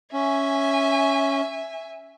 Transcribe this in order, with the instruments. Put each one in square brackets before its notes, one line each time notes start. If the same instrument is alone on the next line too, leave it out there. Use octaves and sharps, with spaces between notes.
[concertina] C#4 [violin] E5 G#5